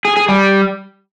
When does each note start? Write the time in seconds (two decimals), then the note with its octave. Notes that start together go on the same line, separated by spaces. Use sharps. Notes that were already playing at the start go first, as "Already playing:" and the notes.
0.05 G#4
0.17 G#4
0.29 G3